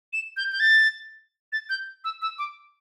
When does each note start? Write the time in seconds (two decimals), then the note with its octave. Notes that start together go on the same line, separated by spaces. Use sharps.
0.13 E7
0.37 G6
0.52 G6
0.60 A6
1.52 A6
1.70 G6
2.04 E6
2.22 E6
2.38 D6